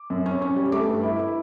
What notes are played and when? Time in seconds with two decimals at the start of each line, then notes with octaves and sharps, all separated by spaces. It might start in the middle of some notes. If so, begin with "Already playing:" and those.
Already playing: D6
0.10 F#2
0.26 C#4
0.42 C#4
0.56 G3
0.72 A3 D6
0.87 G2
1.03 E4
1.19 E4